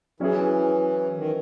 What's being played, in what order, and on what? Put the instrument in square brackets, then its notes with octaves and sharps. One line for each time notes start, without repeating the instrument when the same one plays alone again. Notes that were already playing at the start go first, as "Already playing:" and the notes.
[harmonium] E3 [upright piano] F#3 C#4 E4 G#4
[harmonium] D#3